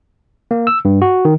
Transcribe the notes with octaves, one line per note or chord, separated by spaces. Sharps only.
A#3
E6
G2
F#4
D#3